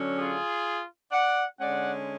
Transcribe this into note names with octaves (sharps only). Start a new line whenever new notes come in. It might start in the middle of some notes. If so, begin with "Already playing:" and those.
Already playing: D3 F#3 C#4
F4 G#4
D5 F#5
D3 G#3 C#4 D5 F#5